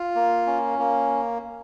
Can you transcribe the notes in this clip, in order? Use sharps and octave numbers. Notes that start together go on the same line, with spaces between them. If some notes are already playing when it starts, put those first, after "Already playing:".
Already playing: F4
A#3
C#4
A#3